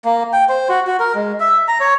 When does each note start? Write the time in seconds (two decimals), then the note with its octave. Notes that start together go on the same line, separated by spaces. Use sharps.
0.05 A#3
0.33 G5
0.49 C5
0.69 F#4
0.87 F#4
1.00 A#4
1.15 G#3
1.40 E5
1.68 A#5
1.80 C#5